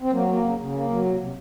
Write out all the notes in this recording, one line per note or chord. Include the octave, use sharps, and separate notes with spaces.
C4
F#3 A#3
A#3
C#3
C#3
A#3
F#3
C3
C3